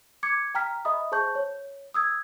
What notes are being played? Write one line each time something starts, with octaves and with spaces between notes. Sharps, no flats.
D6 G#6 C#7
G5 A#5 F6 B6
D#5 E5 B5 D#6
G#4 C5 A5 C#6 G6
C#5
D#6 E6 G#6